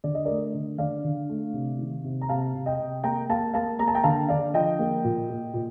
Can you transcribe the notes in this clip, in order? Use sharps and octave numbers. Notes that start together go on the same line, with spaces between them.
D3 D5
D#5
A3 A#4 D5
D3
D3 D5 F5
D3
A3
C3
D#3
C3
A#5
C3 F5 A5
C3
D#5 G5
C3
A#3 G5 A#5
A#3 F5 A5
A#3 F5 A5
A#3 A#5
A5
G5 A#5
D3 F5 A5
D3 D5 F5
F3 D#5 G5
A#3
A#2
A#2
A#2